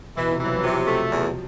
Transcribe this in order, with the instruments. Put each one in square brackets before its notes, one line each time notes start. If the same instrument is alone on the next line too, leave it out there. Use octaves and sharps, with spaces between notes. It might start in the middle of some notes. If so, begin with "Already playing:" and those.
[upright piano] B2 [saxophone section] E3
[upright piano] C3
[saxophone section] E3 [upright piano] F#3
[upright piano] F3
F#3
[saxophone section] C3 [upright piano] F3
[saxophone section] A3
E2